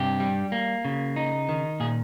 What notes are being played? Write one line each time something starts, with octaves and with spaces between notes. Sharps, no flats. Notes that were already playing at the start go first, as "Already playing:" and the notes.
Already playing: G2 C3 G4
G3
A#3
C#3
D#4
D#3
A#2 G#4